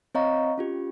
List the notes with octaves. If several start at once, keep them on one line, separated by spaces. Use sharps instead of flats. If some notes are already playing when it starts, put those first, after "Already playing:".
C4 C#5 D#5 F5 A#5 C#6
C#4 F4 G4